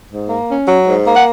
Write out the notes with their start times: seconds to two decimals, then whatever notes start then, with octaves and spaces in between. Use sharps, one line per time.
0.10 G#2
0.29 A#3
0.48 C#4
0.68 F#3
0.86 G#2
1.05 A#3
1.14 F#5